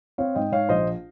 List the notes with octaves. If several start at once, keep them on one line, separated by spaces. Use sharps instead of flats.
C4 C#5 F5
G#2 D#5 G5
G#2 C#5 F5
A#1 C5 D#5